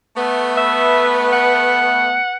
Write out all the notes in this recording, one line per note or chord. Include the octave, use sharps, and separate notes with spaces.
A3 B3
B4 E5
F#5